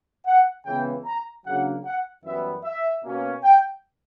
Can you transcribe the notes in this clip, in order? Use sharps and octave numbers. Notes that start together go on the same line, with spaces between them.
F#5
C#2 C#3 E3 B3 G5
A#5
C#3 F#3 A#3 D4 F#5
F#5
F#2 E3 G3 B3 E5
E5
B2 A#3 C#4
G5